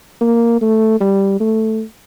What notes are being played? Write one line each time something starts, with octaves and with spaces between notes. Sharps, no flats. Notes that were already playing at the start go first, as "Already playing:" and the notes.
A#3
A3
G3
A3